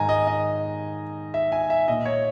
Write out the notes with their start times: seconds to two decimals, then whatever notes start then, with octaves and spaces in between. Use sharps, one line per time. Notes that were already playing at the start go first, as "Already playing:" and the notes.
Already playing: G#2 D#3 G#5 A#5
0.09 D#5
0.27 D#5
1.34 E5
1.52 G#5
1.70 E5
1.88 A#2 D#5
2.05 C#5